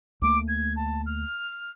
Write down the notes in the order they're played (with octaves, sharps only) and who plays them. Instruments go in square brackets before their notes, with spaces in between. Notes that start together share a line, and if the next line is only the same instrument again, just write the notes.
[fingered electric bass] D2 A3 A#3 [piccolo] D6
[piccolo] G#6
A5
F6